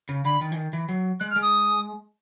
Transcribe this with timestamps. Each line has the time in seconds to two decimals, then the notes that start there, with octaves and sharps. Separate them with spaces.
0.09 C#3
0.25 D3 B5
0.41 D#3
0.52 E3
0.56 D#3
0.73 E3
0.89 F#3
1.20 G#3 F#6
1.30 F6
1.36 G#3
1.42 D#6